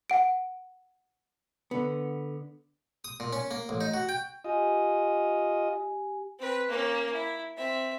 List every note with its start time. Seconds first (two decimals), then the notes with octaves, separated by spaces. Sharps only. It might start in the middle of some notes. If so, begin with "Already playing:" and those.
0.10 F#5 D7
1.71 D3 B3
3.05 D#6
3.20 A#2
3.33 C#4
3.51 A#3
3.69 A1
3.81 D#4
3.94 F#4
4.09 G5
4.45 F4 G4 D#5 G#5
6.39 C4 B4
6.68 A#3 C#4
7.13 E4
7.57 C4 E5